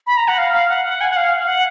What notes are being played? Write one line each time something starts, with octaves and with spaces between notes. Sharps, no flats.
B5
A#5
F#5
F5
F5
F#5
F#5
G#5
F#5
F5
F5
F#5